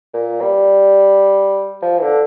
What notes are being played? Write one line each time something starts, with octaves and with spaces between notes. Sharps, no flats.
A#2
G3
F3
E3
D3